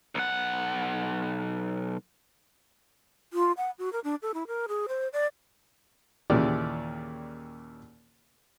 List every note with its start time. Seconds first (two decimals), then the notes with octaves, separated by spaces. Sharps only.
0.15 B1 F#5
3.33 F4
3.57 F#5
3.79 F#4
3.93 A#4
4.04 D4
4.22 A4
4.34 E4
4.47 A#4
4.68 G#4
4.88 C5
5.13 D5
6.30 D#2 A#2 C#3 E3 G4 D5